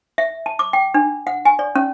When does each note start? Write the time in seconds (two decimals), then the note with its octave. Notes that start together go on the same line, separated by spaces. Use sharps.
0.18 E5
0.46 A5
0.59 D6
0.73 G5
0.94 D4
1.27 F#5
1.45 G#5
1.59 D5
1.75 C#4